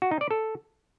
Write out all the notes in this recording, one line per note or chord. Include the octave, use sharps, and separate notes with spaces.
F#4
D#4
D5
A4